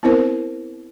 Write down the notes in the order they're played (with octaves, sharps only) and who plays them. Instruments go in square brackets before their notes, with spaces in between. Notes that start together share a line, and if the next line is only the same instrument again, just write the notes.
[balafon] B3 C4 E4 A#4 C5